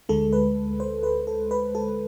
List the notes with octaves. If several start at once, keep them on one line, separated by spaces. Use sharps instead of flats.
D2 D3 G#3 A4
B4
C5
B4
A4
B4
A4